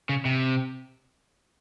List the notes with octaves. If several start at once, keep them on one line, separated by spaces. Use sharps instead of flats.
C#3
C3